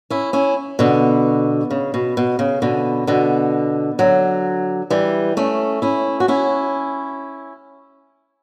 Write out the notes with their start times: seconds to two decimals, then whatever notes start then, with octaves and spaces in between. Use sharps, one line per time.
0.10 C#4 E4
0.33 C#4 E4
0.79 B2 D3
1.70 C#3
1.94 B2
2.17 B2
2.39 C#3
2.62 B2 D3
3.07 B2 D3
3.99 D3 F#3
4.90 E3 G3
5.37 A3 C#4
5.82 C#4 E4
6.20 F#4
6.28 C#4 E4